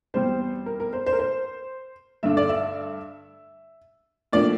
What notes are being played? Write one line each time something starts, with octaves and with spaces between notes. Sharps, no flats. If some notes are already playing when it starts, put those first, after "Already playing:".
E2 C3 G3 C5
A#4
A#4
C5
C5
A#4
C5
G2 D3 A3 D4 E5
D5
E5
A2 F3 A#3 D4 D5